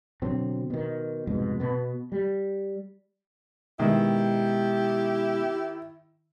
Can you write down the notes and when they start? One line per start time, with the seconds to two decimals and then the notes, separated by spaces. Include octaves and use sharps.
0.22 B2 D3 F#3 C4
0.70 B2 D#3
1.27 C2 F2 G#2 B2
1.60 B2 B3
2.12 G3
3.79 B2 D#3 G#3 E4 G4